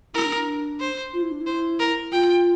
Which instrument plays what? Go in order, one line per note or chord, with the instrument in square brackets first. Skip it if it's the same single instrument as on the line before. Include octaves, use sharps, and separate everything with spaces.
[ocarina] E4 [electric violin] A#4
[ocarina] D4
D4
[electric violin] C5
[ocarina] F4
E4
D4
E4
[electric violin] C5
A#4
[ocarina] F4 [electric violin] G5